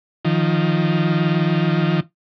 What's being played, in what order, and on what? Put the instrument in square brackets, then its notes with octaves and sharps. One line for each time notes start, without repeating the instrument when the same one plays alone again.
[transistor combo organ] D#3 F3